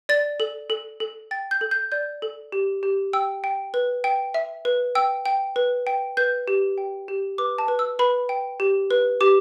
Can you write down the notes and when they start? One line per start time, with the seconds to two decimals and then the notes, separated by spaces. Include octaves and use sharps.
0.09 D5 A6
0.40 A4
0.70 A4
1.00 A4
1.31 G5 A6
1.51 G6
1.61 A4
1.71 G6
1.92 D5 G6
2.22 A4
2.52 G4
2.83 G4
3.13 G5 E6
3.44 G5
3.74 B4
4.04 G5
4.34 E5
4.65 B4
4.95 G5 E6
5.26 G5
5.56 B4
5.87 G5
6.17 B4 G6
6.48 G4
6.78 G5
7.08 G4
7.38 B4 D6
7.58 A5
7.68 B4
7.79 E6
7.99 B4 B5
8.29 G5
8.60 G4
8.91 B4
9.21 G4 D6